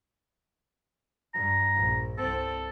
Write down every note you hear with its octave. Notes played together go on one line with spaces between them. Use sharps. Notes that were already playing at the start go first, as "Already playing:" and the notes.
G2 A#5
A#1
C2 C4 A4